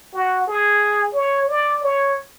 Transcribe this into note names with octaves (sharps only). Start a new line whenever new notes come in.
F#4
G#4
C#5
D5
C#5